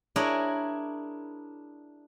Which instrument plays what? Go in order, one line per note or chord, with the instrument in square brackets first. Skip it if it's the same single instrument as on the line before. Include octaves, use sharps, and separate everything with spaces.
[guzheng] D4 E4 G#4 A#4 C#5